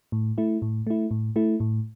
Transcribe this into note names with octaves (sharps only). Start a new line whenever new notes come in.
A2
A3 E4
A2
A3 E4
A2
A3 E4
A2